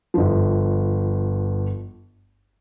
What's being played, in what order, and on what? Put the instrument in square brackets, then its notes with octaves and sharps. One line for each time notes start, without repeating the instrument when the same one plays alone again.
[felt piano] G1 F3